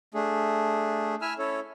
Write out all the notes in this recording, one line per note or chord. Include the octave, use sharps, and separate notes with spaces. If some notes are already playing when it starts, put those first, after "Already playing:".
A3 D4 G#4
E4 E5 G#5 E6 F6
C#4 E4 A4 C#5